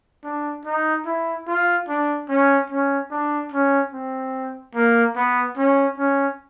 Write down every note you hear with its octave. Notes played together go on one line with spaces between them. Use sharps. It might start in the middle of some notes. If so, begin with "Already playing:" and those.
D4
D#4
E4
F4
D4
C#4
C#4
D4
C#4
C4
A#3
B3
C#4
C#4